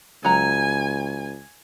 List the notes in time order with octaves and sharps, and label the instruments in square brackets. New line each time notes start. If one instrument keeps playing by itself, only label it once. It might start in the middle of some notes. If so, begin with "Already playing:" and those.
[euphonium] C#2 [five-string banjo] F#3 A#5 [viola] G#5